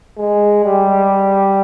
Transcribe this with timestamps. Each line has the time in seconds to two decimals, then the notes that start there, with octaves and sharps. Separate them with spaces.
0.18 G#3
0.64 G3